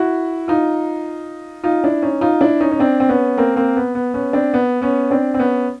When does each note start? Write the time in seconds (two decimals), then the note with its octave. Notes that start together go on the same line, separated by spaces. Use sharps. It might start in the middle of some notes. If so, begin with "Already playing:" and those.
Already playing: E4 F#4
0.48 D#4 F4
1.64 D#4 F4
1.84 D4 E4
2.02 C#4 D#4
2.21 D#4 F4
2.41 D4 E4
2.60 C#4 D#4
2.71 C#4
2.80 C4 D4
3.00 C4
3.09 B3 C#4
3.38 A#3 C4
3.56 A#3 C4
3.77 B3
3.95 B3
4.14 B3 C#4
4.33 C4 D4
4.54 B3
4.81 B3 C#4
5.11 C4 D4
5.34 C4
5.39 B3 C#4